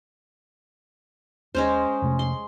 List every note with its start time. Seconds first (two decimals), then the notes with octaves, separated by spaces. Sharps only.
1.55 D#2 G#3 C#4 C5
2.02 F2 C3 A3
2.19 C6